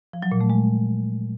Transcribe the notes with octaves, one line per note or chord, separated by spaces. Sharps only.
F3
F#3
A#2
A3
G#3